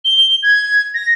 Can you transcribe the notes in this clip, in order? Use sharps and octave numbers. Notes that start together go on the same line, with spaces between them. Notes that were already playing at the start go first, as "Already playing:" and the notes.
G7
G#6
A#6